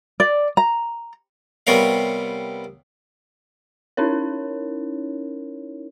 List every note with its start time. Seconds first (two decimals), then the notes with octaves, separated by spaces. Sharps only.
0.20 D5
0.57 A#5
1.67 C3 G3 B3 A#4 C#5 F5
3.97 C#4 D#4 E4 A#4 C#5